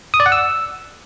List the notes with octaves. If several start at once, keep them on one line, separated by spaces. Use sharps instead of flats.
D#6
D5
F#5
E6